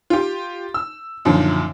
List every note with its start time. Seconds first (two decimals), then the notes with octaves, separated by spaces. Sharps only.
0.10 F4 G4
0.74 E6
1.25 F#2 A#2 D3 D#3 F3